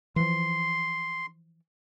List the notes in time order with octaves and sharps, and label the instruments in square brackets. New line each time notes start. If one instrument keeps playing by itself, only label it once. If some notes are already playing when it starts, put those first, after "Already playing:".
[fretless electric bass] E3 F3 [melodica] C6